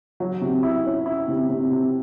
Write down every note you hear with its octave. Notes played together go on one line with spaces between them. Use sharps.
F#3
C3
E4
C#4
E4
C3
C3
C3